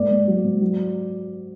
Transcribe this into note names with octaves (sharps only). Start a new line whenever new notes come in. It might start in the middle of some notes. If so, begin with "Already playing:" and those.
Already playing: G#2 A#3 D5
G#2
F#3
G#2
F#3